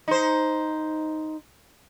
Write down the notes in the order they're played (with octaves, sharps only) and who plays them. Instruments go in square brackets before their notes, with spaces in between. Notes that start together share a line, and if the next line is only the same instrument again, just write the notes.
[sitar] D#4 C5